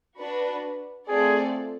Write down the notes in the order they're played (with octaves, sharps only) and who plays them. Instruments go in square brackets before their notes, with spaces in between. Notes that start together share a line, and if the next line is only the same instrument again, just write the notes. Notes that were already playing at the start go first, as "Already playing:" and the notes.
[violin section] D4 F#4 B4
[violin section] A3 C4 F4 A4 D5 [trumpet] G#4